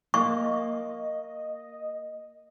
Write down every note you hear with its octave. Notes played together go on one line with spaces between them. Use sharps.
A#3 D#5 C#6